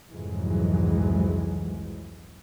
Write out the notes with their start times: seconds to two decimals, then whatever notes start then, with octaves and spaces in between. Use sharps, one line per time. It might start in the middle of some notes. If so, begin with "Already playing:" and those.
0.10 C2 F2 G#2 E3 F#3 G#3